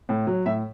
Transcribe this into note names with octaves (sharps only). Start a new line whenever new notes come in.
A2
F#3
A2 E5